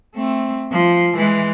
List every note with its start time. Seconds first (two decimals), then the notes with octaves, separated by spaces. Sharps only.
0.15 A3 C4
0.72 F3
1.16 E3 G#3